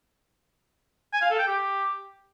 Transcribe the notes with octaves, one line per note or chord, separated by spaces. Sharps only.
G#5
F5
A4
G5
G4